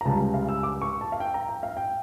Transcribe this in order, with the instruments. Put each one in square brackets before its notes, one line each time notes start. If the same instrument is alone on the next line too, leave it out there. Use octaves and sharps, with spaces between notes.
[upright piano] A#5
C#2 C#3 G3 A5
F5
E6
D6
C#6
A5
F5
G5
A#5
G5
F5
G5